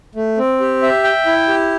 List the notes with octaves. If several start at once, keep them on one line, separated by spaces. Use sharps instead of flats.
A3
C4
G4
E5
G5
E4
G4